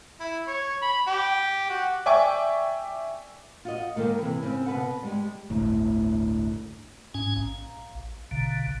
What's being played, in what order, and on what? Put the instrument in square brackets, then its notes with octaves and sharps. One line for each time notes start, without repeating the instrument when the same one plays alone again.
[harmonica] E4
C#5
B5
G4
F#4
[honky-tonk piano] D5 E5 G5 G#5 C#6 D6
[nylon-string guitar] F4 F#4 D#5
D#3 G#3 A#3 A4
C3 E3
C#3 C4
B2 B4 F#5
G3 G#3 G4
[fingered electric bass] G1 D2 A2
[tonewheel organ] G#2 C#4 G#5
A#1
A#1 B2 D3